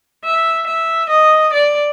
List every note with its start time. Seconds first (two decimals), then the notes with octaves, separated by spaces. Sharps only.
0.24 E5
0.67 E5
1.10 D#5
1.53 D5